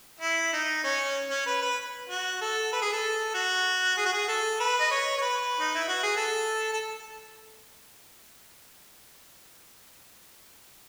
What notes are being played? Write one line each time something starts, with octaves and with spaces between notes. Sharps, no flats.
E4
D#4
C#4
C#4
B4
B4
F#4
A4
B4
G#4
A4
F#4
G#4
F#4
G#4
A4
B4
D#5
C#5
C#5
B4
D#4
E4
F#4
G#4
A4
A4